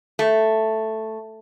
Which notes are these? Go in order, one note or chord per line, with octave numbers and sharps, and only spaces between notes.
A3